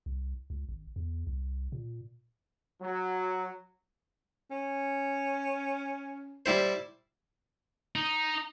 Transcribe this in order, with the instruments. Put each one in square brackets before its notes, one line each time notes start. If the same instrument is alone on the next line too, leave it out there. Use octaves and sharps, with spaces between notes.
[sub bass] C2
C#2
G#1
E2
C2
A#2
[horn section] F#3
[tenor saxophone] C#4
[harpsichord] G3 E4 C5
[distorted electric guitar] D#4